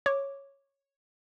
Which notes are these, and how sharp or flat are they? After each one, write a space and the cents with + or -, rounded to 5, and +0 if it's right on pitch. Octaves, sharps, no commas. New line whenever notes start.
C#5 -5 D6 +0